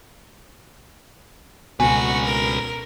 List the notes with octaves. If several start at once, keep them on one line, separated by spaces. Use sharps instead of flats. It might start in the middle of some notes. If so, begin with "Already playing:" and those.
C#2 B2 F#4 A4 B4 G#5
A#4